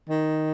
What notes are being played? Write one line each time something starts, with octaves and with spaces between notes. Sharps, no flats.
D#3